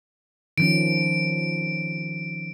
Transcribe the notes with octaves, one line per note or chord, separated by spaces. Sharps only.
D#3 F3 C#4 D7